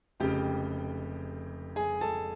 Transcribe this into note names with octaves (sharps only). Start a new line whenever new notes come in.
F1 F2 C#3 G4 G5
G#4 G#5
A4 A5